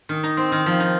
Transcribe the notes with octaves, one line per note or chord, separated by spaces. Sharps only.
D#3
D#4
C4
D#3
F3
D#4